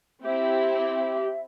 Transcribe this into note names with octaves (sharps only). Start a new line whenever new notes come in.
C4 E4 G4 E5